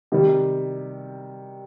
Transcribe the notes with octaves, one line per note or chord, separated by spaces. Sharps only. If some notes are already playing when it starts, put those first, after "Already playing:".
C3 D#3 G3